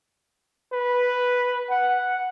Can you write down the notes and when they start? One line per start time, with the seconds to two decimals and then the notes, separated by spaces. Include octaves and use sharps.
0.73 B4
1.71 F#5